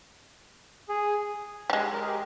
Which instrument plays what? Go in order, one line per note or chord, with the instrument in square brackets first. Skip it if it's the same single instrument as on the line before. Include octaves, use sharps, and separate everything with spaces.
[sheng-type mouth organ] G#4
[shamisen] G3
[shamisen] G#3 [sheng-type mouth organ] G4
[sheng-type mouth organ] A#4
G#4
G4